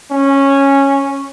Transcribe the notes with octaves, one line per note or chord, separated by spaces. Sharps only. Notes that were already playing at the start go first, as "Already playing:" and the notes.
C#4